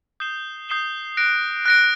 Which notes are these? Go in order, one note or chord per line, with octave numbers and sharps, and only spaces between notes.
D#6 G6 C7 E7 G7
D#6 G6 C7 E7 G7
F#6 A#6 D7
F#6 A#6 D7